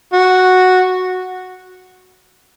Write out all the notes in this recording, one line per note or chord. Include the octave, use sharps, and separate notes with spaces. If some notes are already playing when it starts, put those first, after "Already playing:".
F#4